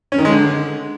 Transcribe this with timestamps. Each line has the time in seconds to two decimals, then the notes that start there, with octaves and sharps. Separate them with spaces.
0.12 C#4
0.18 D#3
0.25 G#3
0.31 D3